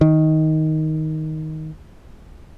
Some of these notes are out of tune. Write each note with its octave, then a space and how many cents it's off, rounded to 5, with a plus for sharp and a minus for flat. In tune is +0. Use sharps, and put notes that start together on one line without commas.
D#3 +10